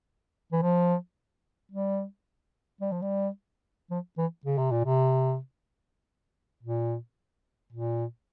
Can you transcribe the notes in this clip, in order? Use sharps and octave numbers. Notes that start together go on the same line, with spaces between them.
E3
F3
G3
G3
F3
G3
F3
E3
C#3
C3
A#2
C3
A#2
A#2